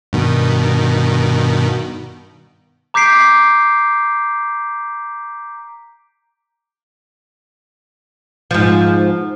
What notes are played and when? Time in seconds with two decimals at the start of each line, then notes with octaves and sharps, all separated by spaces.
0.13 G2 B2 D#3
2.94 A#5 D6 G6 B6 C7 D7
8.51 G#2 F3